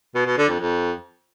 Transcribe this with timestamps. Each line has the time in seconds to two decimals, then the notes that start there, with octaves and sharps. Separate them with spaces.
0.15 B2
0.26 B2
0.38 D3
0.49 F2
0.60 F2